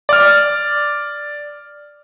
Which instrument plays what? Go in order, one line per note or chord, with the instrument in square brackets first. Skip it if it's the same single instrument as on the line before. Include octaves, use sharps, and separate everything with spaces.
[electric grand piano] D5 F6